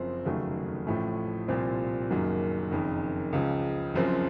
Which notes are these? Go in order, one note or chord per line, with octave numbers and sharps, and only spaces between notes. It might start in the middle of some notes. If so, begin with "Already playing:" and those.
Already playing: F#1 F#2 F3 C4
F1 D#2 C#3 F#3 A3
A1 A2 F3 A3
C2 A#2 F3 C4
F#1 F#2 D#3 F#3 A#3
F#1 F2 D#3
C#2 C#3 F3
F#1 F#2 F3 C4